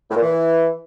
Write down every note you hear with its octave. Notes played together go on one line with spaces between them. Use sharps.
A2
A#2
E3